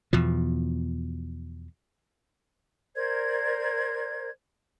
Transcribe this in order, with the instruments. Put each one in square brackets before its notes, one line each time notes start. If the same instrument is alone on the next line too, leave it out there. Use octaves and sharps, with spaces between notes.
[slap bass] E2 B2 F3
[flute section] A#4 C5 D5 G#6